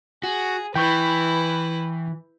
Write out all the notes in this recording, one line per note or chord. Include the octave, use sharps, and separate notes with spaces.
F#4 G#4
E3 E4 B4 G5 C#6 G6